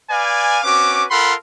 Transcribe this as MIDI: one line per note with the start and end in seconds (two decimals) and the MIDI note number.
0.10 0.59 71
0.10 0.59 74
0.10 0.59 77
0.10 0.59 80
0.63 1.04 60
0.63 1.04 61
0.63 1.04 66
0.63 1.04 71
0.63 1.04 86
1.10 1.34 65
1.10 1.34 69
1.10 1.34 70
1.10 1.34 78
1.10 1.34 83
1.10 1.34 84